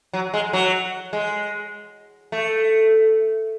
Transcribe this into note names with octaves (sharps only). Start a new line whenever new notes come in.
F#3
G#3
F#3
G#3
A3